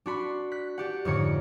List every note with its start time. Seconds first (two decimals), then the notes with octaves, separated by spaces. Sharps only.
0.06 D4 F#4 B5 C6
0.52 F#6 B6
0.78 D4 G4 F#5
1.05 F2 G#2 D3 C#5 C#7